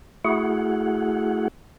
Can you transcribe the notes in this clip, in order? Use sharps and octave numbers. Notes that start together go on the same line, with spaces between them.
A3 E4 F#4 G#4 F#5